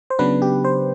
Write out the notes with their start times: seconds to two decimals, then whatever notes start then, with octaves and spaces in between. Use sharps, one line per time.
0.10 C5
0.19 C#3 F#3 B3 D4 B4
0.42 G4
0.64 C5